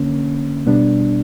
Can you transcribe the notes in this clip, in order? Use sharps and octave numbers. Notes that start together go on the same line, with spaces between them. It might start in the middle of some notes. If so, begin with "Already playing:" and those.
Already playing: D3 A#3 C#4
B2 G3 B3 D4